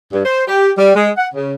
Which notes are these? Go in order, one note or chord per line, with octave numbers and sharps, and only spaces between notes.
G2
C5
G4
G3
G#3
F#5
C#3